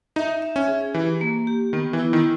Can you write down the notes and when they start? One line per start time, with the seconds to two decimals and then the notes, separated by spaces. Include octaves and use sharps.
0.16 D#4 E5
0.42 E5
0.56 C#4
0.68 G#4
0.94 E3 G4
1.21 A#3
1.47 G4
1.73 D#3 B3
1.93 E3
1.99 E4
2.13 D#3